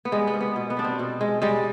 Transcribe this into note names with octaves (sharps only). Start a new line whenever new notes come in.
B3
G3 G#3
B3
G#2
B3
B2
B3
G3 D4
C4
B2
G#3
G3 G#3